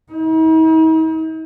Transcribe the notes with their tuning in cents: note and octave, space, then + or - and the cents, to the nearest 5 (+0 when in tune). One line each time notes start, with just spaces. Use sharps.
D#4 +45